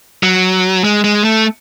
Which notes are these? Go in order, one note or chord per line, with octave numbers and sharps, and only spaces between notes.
F#3
G#3
G#3
A3